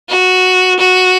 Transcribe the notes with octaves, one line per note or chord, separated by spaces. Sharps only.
F#4
F#4